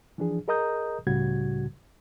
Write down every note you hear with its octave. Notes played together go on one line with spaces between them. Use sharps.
E3 F3 D4 G#4
G#4 A#4 D#5 A#5 D#6 G6
C#2 A2 C#3 G3 F#4 G#6